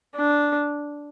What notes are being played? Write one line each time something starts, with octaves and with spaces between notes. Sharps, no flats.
D4